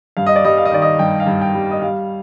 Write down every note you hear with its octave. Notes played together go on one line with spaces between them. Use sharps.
G2 F5
D#5
D5
G3 D#5
F5
D#5
D#3 D5
D#5
G2 G5
F5
G2
G5
G3
D#5
G3 F5